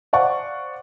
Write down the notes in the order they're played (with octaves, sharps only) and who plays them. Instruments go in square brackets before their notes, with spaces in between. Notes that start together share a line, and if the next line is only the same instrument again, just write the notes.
[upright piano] C5 D5 F5 F#5 C#6